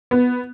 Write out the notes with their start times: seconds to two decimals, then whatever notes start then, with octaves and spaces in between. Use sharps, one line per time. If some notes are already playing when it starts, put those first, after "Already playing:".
0.11 B3